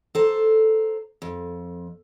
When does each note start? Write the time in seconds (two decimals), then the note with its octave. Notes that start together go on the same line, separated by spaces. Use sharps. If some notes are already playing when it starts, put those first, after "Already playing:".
0.15 A4 C5 A#5
1.22 F2